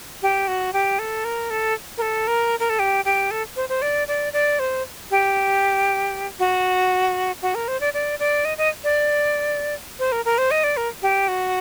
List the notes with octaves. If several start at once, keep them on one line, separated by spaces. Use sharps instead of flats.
G4
F#4
G4
A4
A#4
A4
A#4
A4
A#4
A#4
A4
G4
G4
A4
C5
C5
D5
D5
D5
C5
G4
F#4
F#4
A#4
C5
D5
D5
D5
D#5
D#5
D5
C5
A#4
A#4
C5
D#5
D5
A#4
G4
F#4